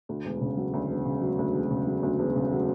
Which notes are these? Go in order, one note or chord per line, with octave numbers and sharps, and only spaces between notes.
D2
E1
C#3
F#3
D2
E1
C#3
F#3
D2
E1
C#3
F#3
D2
E1
C#3
F#3